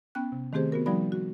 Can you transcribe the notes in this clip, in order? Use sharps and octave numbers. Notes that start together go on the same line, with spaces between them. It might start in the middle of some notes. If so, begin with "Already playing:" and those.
B3 C#4 G5 F#6
C3
D#3 A3 C4 G4 G#4 C5
B3 F#4 A#4
F3 G3 D#4 F#4 D5 B5
F#4